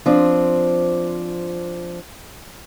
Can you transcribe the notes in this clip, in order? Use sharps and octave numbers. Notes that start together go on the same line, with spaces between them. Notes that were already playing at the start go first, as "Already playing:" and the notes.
F3 C4 D4